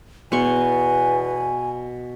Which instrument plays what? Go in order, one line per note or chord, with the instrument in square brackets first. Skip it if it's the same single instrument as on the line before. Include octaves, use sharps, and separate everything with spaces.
[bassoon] E2 [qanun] B2 C6 C#6 [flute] G#5